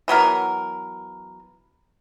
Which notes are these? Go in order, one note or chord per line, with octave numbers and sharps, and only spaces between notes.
E3 F#3 B3 A#4